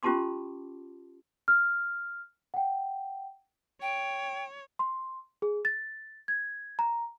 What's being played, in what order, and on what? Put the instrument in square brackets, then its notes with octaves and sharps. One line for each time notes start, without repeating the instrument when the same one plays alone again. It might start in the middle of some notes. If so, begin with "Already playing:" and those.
[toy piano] C#4 F4 G4 A5 C6 D6
[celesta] F6
F#5 G5
[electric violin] C#5 [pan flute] G5
[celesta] C6
G#4
A6
G#6
A#5